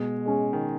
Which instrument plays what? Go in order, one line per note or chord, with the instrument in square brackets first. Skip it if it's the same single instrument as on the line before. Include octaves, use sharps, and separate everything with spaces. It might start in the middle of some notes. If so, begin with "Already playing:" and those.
Already playing: [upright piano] B2 [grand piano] G#3
[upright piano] G#3 C#4 G#4
[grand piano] D#3